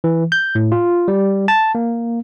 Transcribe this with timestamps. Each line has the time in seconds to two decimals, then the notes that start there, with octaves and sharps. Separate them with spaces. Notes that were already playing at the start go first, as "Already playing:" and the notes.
0.04 E3
0.32 G6
0.55 A2
0.72 F4
1.08 G3
1.48 A5
1.75 A#3